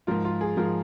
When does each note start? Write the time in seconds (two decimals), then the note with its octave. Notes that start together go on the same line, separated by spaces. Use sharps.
0.07 G#2 F3 F4 A#4
0.25 F4
0.41 G#4
0.57 G#2 F3 F4 A#4